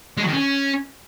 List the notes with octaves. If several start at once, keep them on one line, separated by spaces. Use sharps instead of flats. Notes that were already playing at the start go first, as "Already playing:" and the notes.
G#3
F#3
D#3
C#4